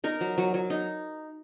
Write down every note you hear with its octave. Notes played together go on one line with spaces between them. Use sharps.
D#4 A#4
F#3
F#3
F#3
D#4